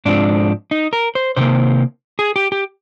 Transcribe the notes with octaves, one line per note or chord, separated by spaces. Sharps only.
G#2 F3 G#3 C4 D4
D#4
A#4
C5
C3 D#3 A#3 C5
G#4
G4
G4